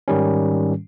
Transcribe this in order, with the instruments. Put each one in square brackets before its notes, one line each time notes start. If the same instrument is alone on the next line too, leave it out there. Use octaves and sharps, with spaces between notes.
[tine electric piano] G#2 D#3 G3 C#4